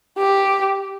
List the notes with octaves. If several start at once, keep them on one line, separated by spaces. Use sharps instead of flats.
G4